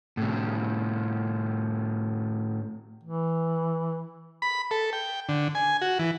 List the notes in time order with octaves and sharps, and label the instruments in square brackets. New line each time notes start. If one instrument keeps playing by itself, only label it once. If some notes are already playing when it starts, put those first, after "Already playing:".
[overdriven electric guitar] A2 C3
[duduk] E3
[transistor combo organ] B5
A4
G5
D3
G#5
F#4
E3